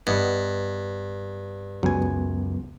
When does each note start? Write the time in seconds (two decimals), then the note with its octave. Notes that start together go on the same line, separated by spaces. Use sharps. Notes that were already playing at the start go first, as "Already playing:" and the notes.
0.07 G2 B3 D#5 F#5
1.83 C#2 F#2 F#3 B3 G#5